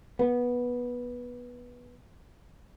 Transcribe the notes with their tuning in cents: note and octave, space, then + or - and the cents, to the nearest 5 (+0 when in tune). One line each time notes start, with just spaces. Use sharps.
B3 -15